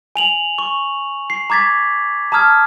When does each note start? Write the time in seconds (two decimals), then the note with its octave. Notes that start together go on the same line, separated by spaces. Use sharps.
0.16 G#5 F7 F#7
0.58 C#6
1.30 C7
1.50 A#5 D6 G#6 A6 B6
2.32 A5 A#5 D#6 F6 G#6